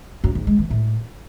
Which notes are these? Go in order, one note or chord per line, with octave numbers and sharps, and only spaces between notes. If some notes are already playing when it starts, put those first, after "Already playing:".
F#2
G#2
G#3
E3
A2